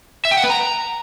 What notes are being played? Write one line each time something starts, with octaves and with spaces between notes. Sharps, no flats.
E5
G5
F#5
B4
A#5